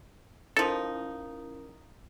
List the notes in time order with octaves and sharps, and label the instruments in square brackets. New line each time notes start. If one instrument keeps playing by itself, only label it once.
[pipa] F3 D#4 [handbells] C#4 E4 A#4 [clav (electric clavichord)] A4